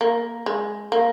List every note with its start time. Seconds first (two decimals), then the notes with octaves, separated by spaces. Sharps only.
0.01 A#3
0.46 G#3
0.92 A#3